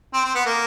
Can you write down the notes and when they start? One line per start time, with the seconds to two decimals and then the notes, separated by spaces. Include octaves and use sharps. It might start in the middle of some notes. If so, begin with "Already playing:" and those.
0.14 C4
0.24 C4
0.35 B3
0.46 A#3